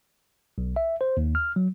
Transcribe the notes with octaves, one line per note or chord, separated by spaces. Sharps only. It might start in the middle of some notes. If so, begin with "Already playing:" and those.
B1
E5
C5
D#2
F6
F#3